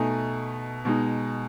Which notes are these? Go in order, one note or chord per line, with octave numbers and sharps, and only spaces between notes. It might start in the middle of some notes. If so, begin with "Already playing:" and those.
Already playing: B2 A3 D#4 G#5
B2 G#3 D#4